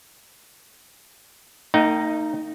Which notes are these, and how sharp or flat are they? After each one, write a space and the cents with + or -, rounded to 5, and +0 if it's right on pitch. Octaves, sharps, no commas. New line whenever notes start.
A#3 -45 D#4 +0 G5 -45